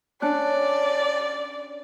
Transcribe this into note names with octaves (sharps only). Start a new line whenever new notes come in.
C#4 D4 D5 F#6